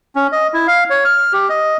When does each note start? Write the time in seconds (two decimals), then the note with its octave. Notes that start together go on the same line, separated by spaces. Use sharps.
0.15 C#4
0.32 D#5
0.53 E4
0.67 F5
0.90 C#5
1.04 F6
1.33 G4
1.49 D#5